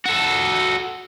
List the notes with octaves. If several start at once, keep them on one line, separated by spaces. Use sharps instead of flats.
F#4 A4